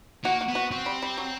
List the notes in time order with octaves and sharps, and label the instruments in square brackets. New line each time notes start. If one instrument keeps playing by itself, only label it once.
[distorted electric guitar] A#3 [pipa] F#4
[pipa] F#4
[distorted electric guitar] B3
[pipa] F#4
[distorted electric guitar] C4 [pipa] F#4
[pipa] G3
G3
F#3